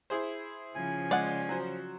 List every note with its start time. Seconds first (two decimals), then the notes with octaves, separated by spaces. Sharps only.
0.10 E4 G#4 C5
0.75 C#3 F3 G#5
1.11 G#3 D5 F#5
1.49 F#3 C5